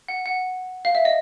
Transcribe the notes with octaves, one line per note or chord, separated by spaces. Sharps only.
F#5
F#5
F5
E5
D#5